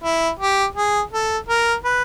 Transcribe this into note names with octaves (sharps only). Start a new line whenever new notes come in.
E4
G4
G#4
A4
A#4
B4